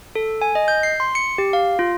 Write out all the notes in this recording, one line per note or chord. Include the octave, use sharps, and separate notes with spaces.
A4
G#5
D#5
G6
C7
C6
C#7
G4
F5
F4